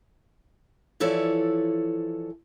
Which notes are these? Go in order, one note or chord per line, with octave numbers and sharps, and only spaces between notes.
E3 F3 E4 A4 C#5 D5